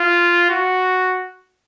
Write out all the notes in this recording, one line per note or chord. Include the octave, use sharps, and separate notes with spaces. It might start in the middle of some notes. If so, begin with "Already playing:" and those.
Already playing: F4
F#4